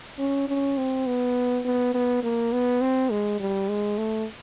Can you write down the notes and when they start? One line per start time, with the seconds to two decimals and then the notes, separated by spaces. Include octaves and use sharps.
0.19 C#4
0.48 C#4
0.78 C4
1.07 B3
1.65 B3
1.94 B3
2.23 A#3
2.52 B3
2.81 C4
3.11 G#3
3.40 G3
3.69 G#3
3.98 A3